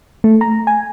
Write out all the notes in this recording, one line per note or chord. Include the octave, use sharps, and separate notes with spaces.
A3
A#5
G#5